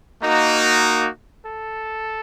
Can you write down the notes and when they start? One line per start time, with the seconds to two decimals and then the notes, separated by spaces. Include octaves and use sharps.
0.20 A#3 D#4 F#4
1.45 A4